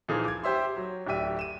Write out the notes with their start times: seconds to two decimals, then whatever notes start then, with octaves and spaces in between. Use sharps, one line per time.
0.08 A#2 E3 F3 D#4 G#4
0.25 D6 G#6
0.44 G4 C5 E5 C6
0.77 F#3
1.07 D1 D4 G4 E5 D#7
1.39 D#7 E7